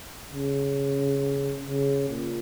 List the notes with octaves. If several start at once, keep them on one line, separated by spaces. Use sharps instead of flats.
C#3
C#3
A#2